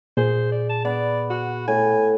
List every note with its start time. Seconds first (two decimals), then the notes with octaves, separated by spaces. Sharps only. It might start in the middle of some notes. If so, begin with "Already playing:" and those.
0.17 A#2 G#4 C5
0.52 D5
0.69 A5
0.85 B3 D5
1.30 F#4
1.68 A2 A4 G#5